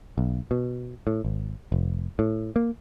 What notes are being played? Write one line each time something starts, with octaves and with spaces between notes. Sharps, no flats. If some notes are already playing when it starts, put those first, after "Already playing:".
B1
B2
A2
G#1
F1
A2
A#3